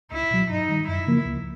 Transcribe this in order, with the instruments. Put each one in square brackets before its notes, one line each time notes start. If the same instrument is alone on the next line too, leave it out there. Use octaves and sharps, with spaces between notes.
[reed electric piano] C#2 [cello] E4
[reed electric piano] B2 F#3
[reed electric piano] G2 [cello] D#4
[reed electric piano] D#3 G3
[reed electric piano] F#2 [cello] E4
[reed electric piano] C#3 F3 A#3
C#2